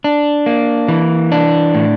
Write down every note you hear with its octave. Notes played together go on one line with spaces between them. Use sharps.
D4
A#3
E3
D4
A2